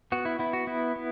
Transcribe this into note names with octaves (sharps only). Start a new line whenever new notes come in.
B3 F#4
E4
B3 E4
F#4
B3 E4
B3